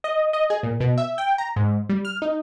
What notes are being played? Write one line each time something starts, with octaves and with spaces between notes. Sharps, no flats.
D#5
D#5
G#4
A#2
B2
E5
G5
A#5
G#2
G3
F6
D#4